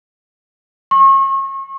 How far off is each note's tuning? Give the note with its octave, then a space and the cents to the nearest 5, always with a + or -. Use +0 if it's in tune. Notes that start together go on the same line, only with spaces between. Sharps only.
C#6 -35